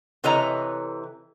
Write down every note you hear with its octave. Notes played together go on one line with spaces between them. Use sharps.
C3 E3 A4 C#5 D#5 A#5